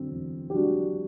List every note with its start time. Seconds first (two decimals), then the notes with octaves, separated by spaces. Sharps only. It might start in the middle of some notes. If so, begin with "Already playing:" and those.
Already playing: D3 F#3 C4
0.11 E2
0.50 G4
0.53 F#3 D4 F#4